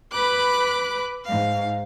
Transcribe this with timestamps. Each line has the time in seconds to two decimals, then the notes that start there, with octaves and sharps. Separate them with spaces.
0.11 B4 B5 D6 F#6
1.24 G#2 F5